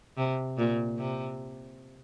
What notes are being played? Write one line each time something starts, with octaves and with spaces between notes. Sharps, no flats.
C3
A#2
C3